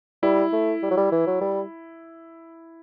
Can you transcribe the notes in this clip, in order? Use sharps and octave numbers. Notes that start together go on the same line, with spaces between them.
G3 E4
A3
G3
F#3
G3
E3
F#3
G3